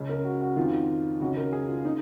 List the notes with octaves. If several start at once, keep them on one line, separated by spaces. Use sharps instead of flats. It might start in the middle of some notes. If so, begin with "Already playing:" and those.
Already playing: C#2 C#3
A#4
F#4
F#4
F2 D#3 F4
C#2 C#3 F#4
A#4
G#4
F4
D#4